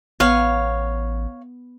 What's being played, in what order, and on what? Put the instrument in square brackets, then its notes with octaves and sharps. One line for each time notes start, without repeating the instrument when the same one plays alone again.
[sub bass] A1 [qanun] B3 [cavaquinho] C#5 F5